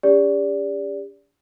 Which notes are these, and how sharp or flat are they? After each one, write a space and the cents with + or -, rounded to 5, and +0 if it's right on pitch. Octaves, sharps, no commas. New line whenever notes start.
D4 -45 G4 +45 D5 -20